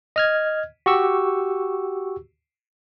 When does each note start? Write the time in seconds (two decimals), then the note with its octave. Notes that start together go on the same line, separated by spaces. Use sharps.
0.16 D#5 F6 G#6
0.86 F#4 G4 C#6 E6